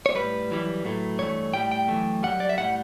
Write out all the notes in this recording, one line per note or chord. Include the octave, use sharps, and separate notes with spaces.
C#5
A2 G3 B4
F#2 E3 G3
A2 F#3 A3
G2 E3 A3 C#5
A2 G3 G5
G5
F#2 E3 A3
F#2 C#3 G3 F#5
D5
E5
A2 G3 F#5